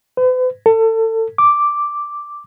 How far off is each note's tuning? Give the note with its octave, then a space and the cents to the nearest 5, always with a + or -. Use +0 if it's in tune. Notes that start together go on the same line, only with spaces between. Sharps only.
B4 +45
A4 +30
D6 +0